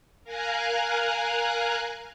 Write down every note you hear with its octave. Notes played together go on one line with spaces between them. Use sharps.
A#4 F5 G#5 A#5 F#6